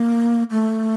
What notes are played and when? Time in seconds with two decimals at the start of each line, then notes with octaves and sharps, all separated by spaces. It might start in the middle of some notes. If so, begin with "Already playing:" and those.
Already playing: A#3
0.51 A3